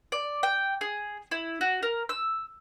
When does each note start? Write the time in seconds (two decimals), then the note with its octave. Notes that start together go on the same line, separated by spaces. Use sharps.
0.12 D5
0.43 G5
0.81 G#4
1.31 E4
1.61 F#4
1.83 A#4
2.09 E6